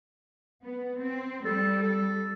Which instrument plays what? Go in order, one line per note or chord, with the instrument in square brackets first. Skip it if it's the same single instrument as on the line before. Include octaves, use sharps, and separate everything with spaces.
[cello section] B3
C4
[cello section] G3 [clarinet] A4
[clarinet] A4